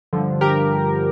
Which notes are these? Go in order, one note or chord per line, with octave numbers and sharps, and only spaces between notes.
G2 D3 F3
G4 A#4